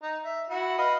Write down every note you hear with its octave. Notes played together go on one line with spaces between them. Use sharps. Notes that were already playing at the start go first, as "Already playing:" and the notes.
D#4
E5
E4 F#4
B4 D#5 F5